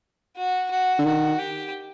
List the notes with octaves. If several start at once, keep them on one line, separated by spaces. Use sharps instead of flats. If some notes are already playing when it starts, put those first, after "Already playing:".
F#4
F#4
D3
D#3 F#4
G4